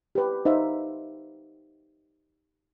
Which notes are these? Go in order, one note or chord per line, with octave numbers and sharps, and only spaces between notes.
G4 B4
D#4 C5 E5 F5